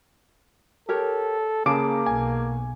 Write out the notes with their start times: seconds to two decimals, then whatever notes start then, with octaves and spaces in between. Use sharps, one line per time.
0.89 G4 A4 A#4 C#5
1.66 C#3 A#3 G#4 A5 D6 D7
2.06 B1 B2 G#5